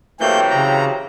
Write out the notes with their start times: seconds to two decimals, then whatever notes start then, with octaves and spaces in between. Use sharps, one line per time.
0.21 C3 E3 F#3 A3 A#3 G5 G6
0.50 C#3 A#5